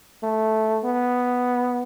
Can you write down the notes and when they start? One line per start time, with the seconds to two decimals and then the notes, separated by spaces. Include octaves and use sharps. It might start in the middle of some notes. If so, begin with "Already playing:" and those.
0.23 A3
0.85 B3